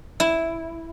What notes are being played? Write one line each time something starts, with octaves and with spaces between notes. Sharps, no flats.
E4